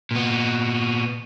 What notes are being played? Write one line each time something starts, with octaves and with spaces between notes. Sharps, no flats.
A#2 B3